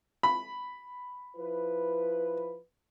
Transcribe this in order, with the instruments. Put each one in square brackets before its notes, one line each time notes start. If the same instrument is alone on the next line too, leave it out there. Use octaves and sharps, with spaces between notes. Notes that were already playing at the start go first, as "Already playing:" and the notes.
[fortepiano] B5
[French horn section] F3 E4 B4